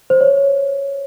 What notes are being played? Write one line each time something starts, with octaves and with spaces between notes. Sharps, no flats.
C5
C#5